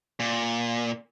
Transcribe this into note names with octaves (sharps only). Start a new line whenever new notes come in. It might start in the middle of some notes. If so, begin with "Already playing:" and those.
A#2